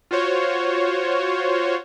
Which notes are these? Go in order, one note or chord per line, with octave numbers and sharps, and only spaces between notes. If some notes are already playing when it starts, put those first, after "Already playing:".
F4 F#4 C5 C#5